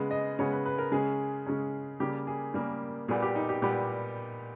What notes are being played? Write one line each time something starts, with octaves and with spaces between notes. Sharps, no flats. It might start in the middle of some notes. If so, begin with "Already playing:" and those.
Already playing: C#3 G#3 B3
D#5
C#3 G#3 B3 C#5
B4
B4
A#4
C#3 G#3 C#4 G#4
C#3 G#3 C#4
C#3 G3 A#3 G4
G#4
C#3 G3 A#3
A#2 G3 B3 G#4
G4
D#4
G4
A#2 G3 B3 G4